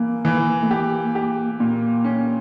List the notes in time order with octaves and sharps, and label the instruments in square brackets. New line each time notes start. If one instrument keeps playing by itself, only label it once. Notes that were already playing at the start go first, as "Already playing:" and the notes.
Already playing: [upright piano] E3 [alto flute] A#3
[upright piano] E3
[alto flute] A3
[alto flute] A#3 [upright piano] G4
[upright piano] G4
[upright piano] A#2 [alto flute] A#3
[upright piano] C#4